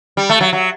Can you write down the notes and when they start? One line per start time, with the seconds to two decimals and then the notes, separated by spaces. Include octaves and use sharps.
0.17 G3
0.29 A3
0.41 F#3
0.53 F#3